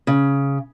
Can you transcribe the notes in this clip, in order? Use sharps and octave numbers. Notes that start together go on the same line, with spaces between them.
C#3